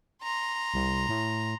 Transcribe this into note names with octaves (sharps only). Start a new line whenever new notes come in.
A#5 C6
C2
A2